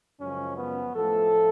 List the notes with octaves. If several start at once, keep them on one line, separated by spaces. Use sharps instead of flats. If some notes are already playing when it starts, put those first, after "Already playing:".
F#2 C#3 F3 G#3 C#4
B3
A2 F3 A3 A4